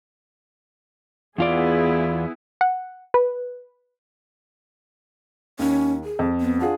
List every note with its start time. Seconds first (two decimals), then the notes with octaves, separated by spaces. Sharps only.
1.38 E2 B3 E4 F4 G#4 D5
2.61 F#5
3.14 B4
5.59 D#2 C#4
6.04 G#4
6.19 F2
6.41 B3
6.60 D4 F4 G#4 F#5